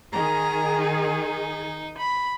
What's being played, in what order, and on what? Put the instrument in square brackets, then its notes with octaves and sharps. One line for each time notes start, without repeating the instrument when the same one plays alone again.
[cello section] D#3 G#4 [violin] A#5
[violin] D#4
B5